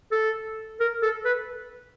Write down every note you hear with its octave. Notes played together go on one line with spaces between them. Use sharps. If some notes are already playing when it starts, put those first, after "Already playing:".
A4
A#4
A4
B4